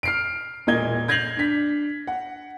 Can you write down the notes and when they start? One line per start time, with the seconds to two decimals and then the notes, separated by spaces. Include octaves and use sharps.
0.03 F6 C7 D7
0.67 E1 A#2 D#5 G#6 G7
1.08 G6 G#6 A#6 C7 F7 F#7
1.37 D4 B6
2.07 F#5